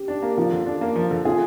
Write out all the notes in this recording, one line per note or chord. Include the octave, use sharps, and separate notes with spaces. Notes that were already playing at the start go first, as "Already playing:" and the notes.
Already playing: G4
D4
A#3
F3 F4
D3
D4
A#3
F3
D3
F4 G#4